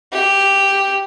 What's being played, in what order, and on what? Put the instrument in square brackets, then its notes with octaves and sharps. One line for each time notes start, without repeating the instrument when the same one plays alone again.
[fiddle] G4